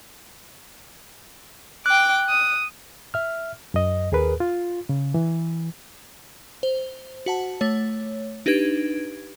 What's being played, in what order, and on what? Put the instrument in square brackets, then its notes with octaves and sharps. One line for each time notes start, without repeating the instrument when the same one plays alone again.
[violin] G5 D6 [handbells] F#6
[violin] D#6
[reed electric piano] E5 F6
F#2 D#5
D#2 G#4 A#4 B4
F4
C#3
E3
[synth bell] C5
F#4 F#5 A5
A3 C#5
D4 D#4 G4 B4 G#6 D7